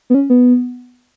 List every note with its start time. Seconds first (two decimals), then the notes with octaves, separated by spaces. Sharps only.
0.10 B3
0.14 C#4
0.30 B3